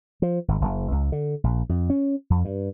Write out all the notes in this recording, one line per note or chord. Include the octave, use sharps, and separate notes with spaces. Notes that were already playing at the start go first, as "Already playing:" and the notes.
F3
G#1
F#1
C#2
D3
A#1
F2
C#4
F2
G2